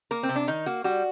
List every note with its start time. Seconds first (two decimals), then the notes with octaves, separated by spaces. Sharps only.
0.11 A#3 A#4
0.23 C4
0.29 C3
0.36 D4
0.48 D#3 D#4
0.66 A#3 F#4
0.84 G3 F#4